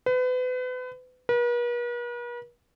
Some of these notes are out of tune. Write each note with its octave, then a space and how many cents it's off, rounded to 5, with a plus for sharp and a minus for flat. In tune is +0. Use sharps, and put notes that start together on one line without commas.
B4 +35
B4 -45